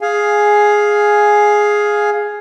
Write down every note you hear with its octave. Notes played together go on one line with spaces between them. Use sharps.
G#4 F5 G#5